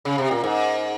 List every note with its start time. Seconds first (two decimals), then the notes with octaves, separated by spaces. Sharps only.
0.05 C#3
0.18 C3
0.31 A#2
0.44 G#2